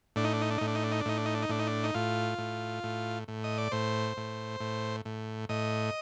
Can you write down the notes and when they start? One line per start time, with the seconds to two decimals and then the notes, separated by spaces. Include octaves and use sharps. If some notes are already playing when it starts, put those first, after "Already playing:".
0.16 A2 D4
0.24 D#4
0.34 D4
0.41 D#4
0.50 D4
0.58 A2 D#4
0.67 D4
0.75 D#4
0.84 D4
0.92 D#4
1.00 D4
1.05 A2 D#4
1.17 D4
1.26 D#4
1.35 D4
1.42 D#4
1.49 A2 D4
1.59 D#4
1.67 D4
1.84 D#4
1.94 A2 F4
2.38 A2
2.83 A2
3.28 A2
3.44 D#5
3.58 D5
3.72 A2 C5
4.17 A2
4.60 A2
5.05 A2
5.49 A2 D#5